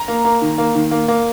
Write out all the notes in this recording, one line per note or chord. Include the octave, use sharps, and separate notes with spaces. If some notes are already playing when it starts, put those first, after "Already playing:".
Already playing: A#5
A#3
A#3
D#3
A#3
D#3
A#3
A#3